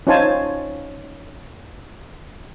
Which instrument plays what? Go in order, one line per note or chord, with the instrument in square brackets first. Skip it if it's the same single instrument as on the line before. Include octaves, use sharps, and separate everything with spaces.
[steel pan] C#4 D#4 F4 C5 G#5 A5